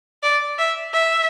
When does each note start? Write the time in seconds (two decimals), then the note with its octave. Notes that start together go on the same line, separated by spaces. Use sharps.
0.23 D5
0.58 E5
0.93 E5